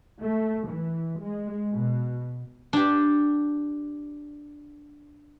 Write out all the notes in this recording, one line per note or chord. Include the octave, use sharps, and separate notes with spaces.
A3
E3
G#3
B2
D4 G4